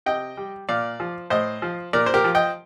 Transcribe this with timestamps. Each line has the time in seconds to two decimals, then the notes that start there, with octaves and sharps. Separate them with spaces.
0.06 C3 D#5 G5
0.37 G3
0.69 A#2 D5 F5
1.00 F3
1.30 A2 C5 D#5
1.62 F3
1.93 A#2 A#4 D5
2.06 C5
2.14 G4 A#4
2.24 F3
2.35 D#5 G5